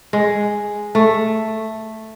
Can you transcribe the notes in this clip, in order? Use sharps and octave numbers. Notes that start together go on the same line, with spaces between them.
G#3
A3